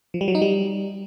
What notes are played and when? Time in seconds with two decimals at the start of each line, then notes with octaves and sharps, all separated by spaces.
0.14 F3
0.21 G3
0.28 F#3
0.35 D#4
0.42 G3